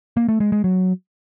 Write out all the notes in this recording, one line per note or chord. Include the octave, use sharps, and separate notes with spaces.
A#3
A3
G#3
G#3
F#3